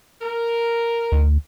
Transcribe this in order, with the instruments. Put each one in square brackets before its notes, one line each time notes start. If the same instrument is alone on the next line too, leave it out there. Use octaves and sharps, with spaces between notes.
[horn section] A#4
[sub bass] D2